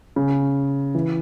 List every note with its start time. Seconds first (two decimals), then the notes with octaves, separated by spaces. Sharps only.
0.16 C#3
0.95 E3